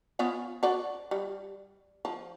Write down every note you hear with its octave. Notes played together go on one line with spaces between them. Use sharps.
B3 C#4 F4
F#4 D5
G3
F3